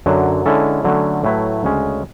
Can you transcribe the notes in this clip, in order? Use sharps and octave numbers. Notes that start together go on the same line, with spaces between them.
F#2 D3 F#3
D3 G#3 C#4 E4 A4
D3 F#3 A3 C#4
A2 F#3 A3 E4 B4
D2 C#3 G#3 C#4